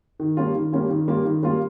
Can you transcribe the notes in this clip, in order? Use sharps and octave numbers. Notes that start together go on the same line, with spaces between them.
D#3
G3 A#3 C#4 F4
D#3
G3 A#3 C#4 F4
D#3
G3 A#3 C#4 F4
D#3
G3 A#3 C#4 F4